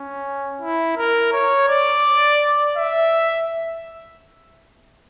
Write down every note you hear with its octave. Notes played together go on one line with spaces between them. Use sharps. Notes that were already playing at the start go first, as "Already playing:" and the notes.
Already playing: C#4
E4
A#4
C#5
D5
E5